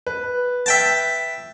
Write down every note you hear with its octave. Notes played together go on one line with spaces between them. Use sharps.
B4
E5 G5 A5